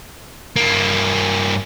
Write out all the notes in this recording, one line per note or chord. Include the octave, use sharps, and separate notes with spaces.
G2 A#3